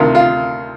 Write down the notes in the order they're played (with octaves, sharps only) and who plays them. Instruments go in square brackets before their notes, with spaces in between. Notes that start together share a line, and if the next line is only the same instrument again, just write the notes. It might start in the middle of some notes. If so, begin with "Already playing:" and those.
Already playing: [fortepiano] D2 C3 D#3 F4
F4